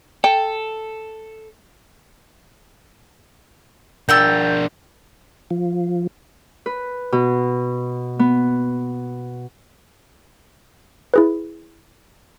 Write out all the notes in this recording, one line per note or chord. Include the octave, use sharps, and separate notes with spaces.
A4 G5
D4 A#4 F#5 G5 E6 G6 A6
F3
B4
B2
B3
E4 G#4 B4